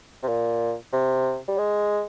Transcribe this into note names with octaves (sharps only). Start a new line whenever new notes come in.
C3
A#2
C3
G3
G#3